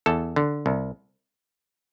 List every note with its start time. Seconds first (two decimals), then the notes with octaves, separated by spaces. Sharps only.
0.06 E2 A4
0.36 D3
0.66 C2